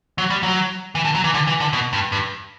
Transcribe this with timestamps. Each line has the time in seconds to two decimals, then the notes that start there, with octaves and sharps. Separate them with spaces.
0.18 F#3
0.30 G3
0.43 F#3
0.95 E3
1.05 D3
1.15 F#3
1.24 E3
1.34 D3
1.47 E3
1.60 D3
1.73 B2
1.93 G2
2.12 G2